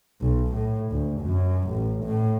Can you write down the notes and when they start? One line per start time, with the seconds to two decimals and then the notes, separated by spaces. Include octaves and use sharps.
0.22 B1
0.54 A2
0.92 D2
1.22 F#2
1.70 A1
2.05 A2